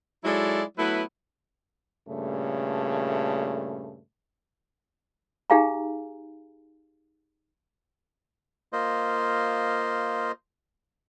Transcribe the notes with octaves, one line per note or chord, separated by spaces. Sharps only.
F#3 G#3 D#4 E4 A4 D5
F#3 A3 B3 E4 B4
G2 A#2 C#3 A3
D#4 G4 G#4 F5 G#5 A#5
A#3 F4 C5 D#5